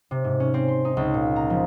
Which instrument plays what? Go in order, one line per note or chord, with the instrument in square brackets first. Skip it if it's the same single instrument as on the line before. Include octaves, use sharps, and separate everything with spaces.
[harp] C3
G#2
C#4
C4
C6
D#4
C#2
A#2
A#5
F3